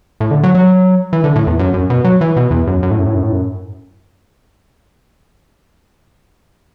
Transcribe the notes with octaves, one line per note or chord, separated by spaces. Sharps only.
A2
D3
F#3
F#3
E3
D3
A2
E2
F#2
F#2
B2
F#3
E3
B2
E2
F#2
F#2
A2
F#2
A2
F#2
A2
F#2